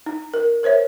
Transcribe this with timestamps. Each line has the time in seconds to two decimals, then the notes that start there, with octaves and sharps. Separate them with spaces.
0.06 D#4
0.34 A#4
0.63 A#4 C5 C#5 E5